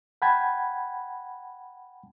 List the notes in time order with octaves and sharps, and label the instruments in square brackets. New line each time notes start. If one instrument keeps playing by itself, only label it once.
[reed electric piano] F#5 G5 A5 B5 G#6